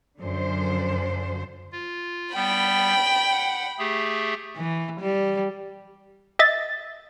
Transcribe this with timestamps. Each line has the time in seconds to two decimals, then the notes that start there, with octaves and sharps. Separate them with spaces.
0.19 F#2 D3 F3 C5
1.72 F4
2.35 G3 B3 G5 B5
3.31 F#5
3.79 A3 G4 G#4
4.56 E3
5.00 G3
6.39 D#5 E5 A6